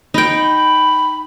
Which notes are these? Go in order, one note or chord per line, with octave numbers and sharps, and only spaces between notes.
D#4 G5 B5